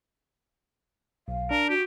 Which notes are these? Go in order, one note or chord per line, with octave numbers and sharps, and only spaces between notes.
B1 F5
D4 A#4
F#4 G4